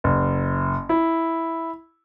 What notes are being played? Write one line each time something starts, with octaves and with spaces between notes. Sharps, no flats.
F#1
E4